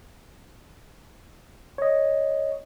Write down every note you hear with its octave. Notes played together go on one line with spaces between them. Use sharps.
C#5 D#5